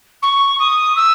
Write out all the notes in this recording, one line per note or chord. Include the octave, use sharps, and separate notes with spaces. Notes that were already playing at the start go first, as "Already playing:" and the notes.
C#6
D#6
E6